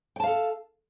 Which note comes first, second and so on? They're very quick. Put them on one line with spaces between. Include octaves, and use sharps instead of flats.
G5 A5 F5 A4